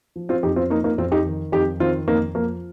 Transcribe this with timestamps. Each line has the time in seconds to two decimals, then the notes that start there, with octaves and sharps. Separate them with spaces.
0.16 F3
0.29 C4 F4
0.43 F2 D#4 G4
0.56 C4 F4
0.70 F3 A#3 D#4
0.84 A#3 D#4
0.98 F2 C4 F4
1.12 D#4 G4
1.26 D#3
1.52 F2 D#4 G4
1.80 D#3 C4 F4
2.08 F2 A#3 D#4
2.35 F3 A#3